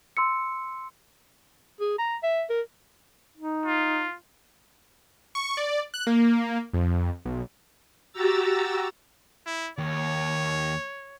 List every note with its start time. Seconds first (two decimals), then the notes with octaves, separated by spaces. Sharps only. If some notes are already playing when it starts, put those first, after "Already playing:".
0.17 C6 E6 C#7
1.80 G#4
1.98 A#5
2.23 E5
2.50 A#4
3.37 D#4
3.66 F4
5.35 C#6
5.57 D5
5.94 F#6
6.07 A#3
6.73 F2
7.25 B1
8.12 F#4 G4 A#5 E6 A6
9.46 E4
9.78 D#2 C#5